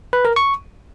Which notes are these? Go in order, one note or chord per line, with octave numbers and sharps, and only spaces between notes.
B4
A#4
C#6